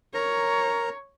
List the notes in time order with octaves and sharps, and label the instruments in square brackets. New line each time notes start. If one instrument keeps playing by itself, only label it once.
[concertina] A#4 A#5 [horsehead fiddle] C#5